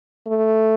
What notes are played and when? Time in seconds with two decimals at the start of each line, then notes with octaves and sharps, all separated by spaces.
0.27 A3